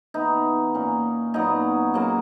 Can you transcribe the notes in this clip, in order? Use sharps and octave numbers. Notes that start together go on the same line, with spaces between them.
E3 B3 D#4
A#2 A#3 C#4
A#2 F#3 B3 D#4
C#3 F#3 A#3